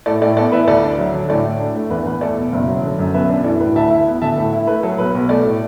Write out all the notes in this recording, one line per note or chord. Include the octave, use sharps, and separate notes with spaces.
A2 A4 D5
A2 A4 D5
B3 A4 D5
E3 B4 E5
D2 A4 D5
D4
F#3
D3
A2 A4 D5
A2
D4
A3
E2 B4
E2 B4
A3 A4 D5
B2
F#1
F#3
D3
F#2
B1 B4 E5
D4
E3 A4 D5
A2 B4
D2 E5 A5
E4
B3
D3 E5 A5
A2 A4
E4
A3 B4
F#3 A4
B1 B4
B1
A3 A4 D5
A2